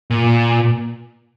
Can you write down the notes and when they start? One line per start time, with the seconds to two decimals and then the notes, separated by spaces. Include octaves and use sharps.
0.10 A#2